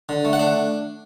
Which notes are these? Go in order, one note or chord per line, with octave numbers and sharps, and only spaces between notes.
D3
A3
F#5
D4